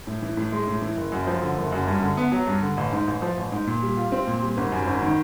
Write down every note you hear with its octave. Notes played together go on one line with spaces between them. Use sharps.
A2
E3
A2
G#3
A2
E3
F#1
F#2
F3
D3
F#1
F#2
G2
D3
B3
F#3
G2
D3
A1
G#2
A1
F3
A1
G#2
A#2
G3
F4
C4
A#2
G3
G#1
F#2
G#1
D#3